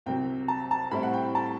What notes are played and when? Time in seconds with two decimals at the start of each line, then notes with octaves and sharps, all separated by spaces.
0.06 C2 C3 F#3 G5
0.48 A5
0.71 A5
0.91 A2 G3 C4 E4 B5
1.03 F#5
1.14 G5
1.35 A5